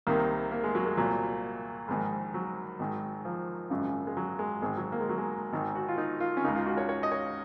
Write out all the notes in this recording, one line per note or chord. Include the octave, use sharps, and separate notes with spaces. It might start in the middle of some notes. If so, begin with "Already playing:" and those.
C2 C3 D#3 A#3
A#3
G#3
F#3
G#3
C2 A#2 F#3
A#1 G#2 D#3
F#3
G#1 G#2 D#3
F3
G#1 F#2 C#3
G#3
F#3
G#3
G#1 G#2 D#3 G#3
F#3
A#3
G#3
F#3
G#3
G#1 G#2 D#3
F#4
F4
D#4
F4
C#4
C#2 C#3 D#4
F4
F#4
C#5
C#5
D#5
C#5